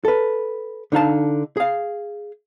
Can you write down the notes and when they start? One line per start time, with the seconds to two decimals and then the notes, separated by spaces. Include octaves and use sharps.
0.05 A4 B4
0.92 D3 D#4 F5 A5
1.57 G#4 F5